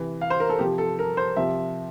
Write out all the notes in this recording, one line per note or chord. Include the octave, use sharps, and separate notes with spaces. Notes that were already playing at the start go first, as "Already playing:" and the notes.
Already playing: C3 E3
F5
C5
A#4
A4
C3 F3 G4
A4
A#4
C5
C3 F3 E5